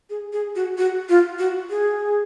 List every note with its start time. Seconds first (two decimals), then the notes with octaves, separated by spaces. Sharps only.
0.10 G#4
0.33 G#4
0.55 F#4
0.78 F#4
1.09 F4
1.39 F#4
1.70 G#4